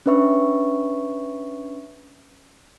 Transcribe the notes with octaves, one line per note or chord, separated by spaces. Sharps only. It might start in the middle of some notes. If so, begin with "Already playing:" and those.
C#4 D4 B4 E5 C#6